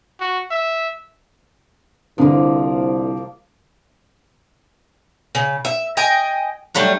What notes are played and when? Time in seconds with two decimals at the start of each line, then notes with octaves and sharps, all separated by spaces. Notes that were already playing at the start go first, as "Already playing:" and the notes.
0.20 F#4
0.51 E5
2.18 C2 D3 E3 F3 A#3
5.35 C#3
5.65 E5
5.97 D#5 G5 G#5
6.75 F#3 G3 A3 D4